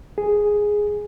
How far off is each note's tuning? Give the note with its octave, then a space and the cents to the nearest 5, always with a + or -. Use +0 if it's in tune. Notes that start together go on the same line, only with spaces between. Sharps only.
G#4 +0